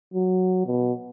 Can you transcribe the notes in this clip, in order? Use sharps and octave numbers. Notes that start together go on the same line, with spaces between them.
F#3
B2